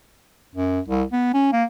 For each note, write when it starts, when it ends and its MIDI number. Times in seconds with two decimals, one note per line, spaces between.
0.55 0.80 42
0.88 1.03 36
1.12 1.30 59
1.34 1.50 61
1.52 1.64 58